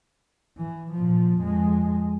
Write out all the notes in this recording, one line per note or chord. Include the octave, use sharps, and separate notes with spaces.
E3
A#2 F3
F2 G#3